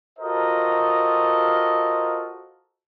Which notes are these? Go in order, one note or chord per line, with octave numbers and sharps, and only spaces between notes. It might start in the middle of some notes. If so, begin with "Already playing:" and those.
F4 F#4 A4 A#4 C5 D#5